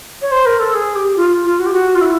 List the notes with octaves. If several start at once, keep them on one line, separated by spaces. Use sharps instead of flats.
C#5
C5
A#4
A4
G#4
G4
F4
F4
F#4
G4
F#4
F4
E4